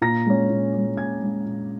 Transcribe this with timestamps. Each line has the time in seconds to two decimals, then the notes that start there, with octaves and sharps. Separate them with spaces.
0.01 A#2 A#5 A#6
0.26 G#3 C#4
0.50 A#2
0.73 G#3 C#4
0.97 A#2 G#5 G#6
1.21 G#3 C#4
1.46 A#2